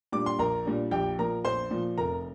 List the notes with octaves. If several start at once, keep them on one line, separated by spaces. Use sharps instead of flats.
A#2 G3 D4 D6
C6
A#1 A#4 A#5
A#2 G3 D4
A#1 G4 G5
A#2 F3 A#4 A#5
A#1 C5 C6
A#2 F3
F1 A#4 A#5